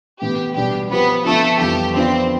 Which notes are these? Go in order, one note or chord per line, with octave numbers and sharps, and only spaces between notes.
A2 E3 B3 G4
B2 G3 B3 D4 G4
F3 B3 C4 G4 B4
D3 F3 A3 B3 A4
F2 E3 G3 B3 F4 G4
D3 F3 B3 C4 D4 F4